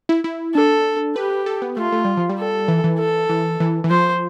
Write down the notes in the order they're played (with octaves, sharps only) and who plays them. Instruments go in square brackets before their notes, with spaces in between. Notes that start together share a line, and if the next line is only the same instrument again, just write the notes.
[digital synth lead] E4
E4
[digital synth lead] D4 [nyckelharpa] A4
[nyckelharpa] G4 [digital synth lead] B4
[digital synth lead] A4
B3
[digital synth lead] A3 [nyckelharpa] F4
[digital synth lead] A3
G3
F3
G3
[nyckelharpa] A4
[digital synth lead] E3
E3
[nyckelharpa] A4
[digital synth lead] E3
E3
E3
[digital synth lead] F3 [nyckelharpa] C5